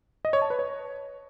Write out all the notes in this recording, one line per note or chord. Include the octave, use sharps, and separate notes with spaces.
D#5
C#5
A5
B4
C#5